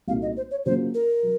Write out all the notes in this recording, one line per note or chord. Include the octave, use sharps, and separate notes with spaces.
C2 A#2 A3 D#4 F#4 F5
D#5
C5
C#5
C#3 F#3 A#3 C#4 F4 C5
A#4
F#3